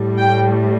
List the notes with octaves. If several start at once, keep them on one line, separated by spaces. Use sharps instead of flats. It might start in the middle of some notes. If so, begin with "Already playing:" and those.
Already playing: A2 G3
G5